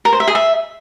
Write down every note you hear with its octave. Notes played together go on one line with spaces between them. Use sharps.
A#4
C5
E5
G#4
E5